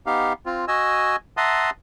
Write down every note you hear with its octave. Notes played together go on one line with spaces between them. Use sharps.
B3 D#4 G4 F5
C4 F4
F#4 D#5 G#5 E6
E5 F#5 A5 A#5 C6 D#6